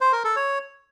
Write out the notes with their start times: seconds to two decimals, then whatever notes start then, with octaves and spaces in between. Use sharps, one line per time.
0.01 C5
0.13 A#4
0.24 A4
0.36 C#5